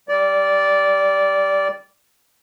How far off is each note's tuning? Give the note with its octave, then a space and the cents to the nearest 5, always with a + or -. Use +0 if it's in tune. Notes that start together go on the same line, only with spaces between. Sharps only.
G3 +0 D5 -15